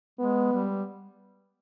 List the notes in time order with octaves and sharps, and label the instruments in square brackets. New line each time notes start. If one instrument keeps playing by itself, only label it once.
[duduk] G#3 [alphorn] B3
[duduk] G3